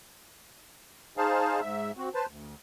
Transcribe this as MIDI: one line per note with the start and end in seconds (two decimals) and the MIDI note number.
1.17 1.60 63
1.17 1.60 68
1.17 1.60 72
1.17 1.60 77
1.17 1.60 81
1.61 1.91 44
1.61 1.91 76
1.97 2.09 60
1.97 2.09 66
2.14 2.26 71
2.14 2.26 72
2.14 2.26 81
2.28 2.55 38